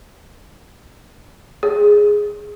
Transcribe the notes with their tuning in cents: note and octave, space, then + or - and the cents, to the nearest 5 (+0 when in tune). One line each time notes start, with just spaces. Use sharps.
G#4 -5